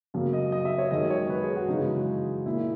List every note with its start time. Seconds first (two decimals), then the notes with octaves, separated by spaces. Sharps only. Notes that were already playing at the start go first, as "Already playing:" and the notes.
0.14 F#2 C#3 F#3 A#3
0.33 D#5
0.52 D#5
0.65 E5
0.78 C#5
0.91 F#2 D#3 G#3 D#5
1.10 C#5
1.30 B4
1.43 G#4
1.56 F#4
1.68 F#2 C#3 E3 G#3 D#4
2.46 A#2 A#3 E4